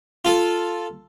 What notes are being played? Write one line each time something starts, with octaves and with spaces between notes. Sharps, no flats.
F4 A4